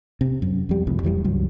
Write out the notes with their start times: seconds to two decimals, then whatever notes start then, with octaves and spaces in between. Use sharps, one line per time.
0.21 C3
0.42 F#2
0.69 F2 G3
0.87 F1 C2 F2 A2
1.03 F2 E3 F#3 G3
1.24 C#2 G2 F#3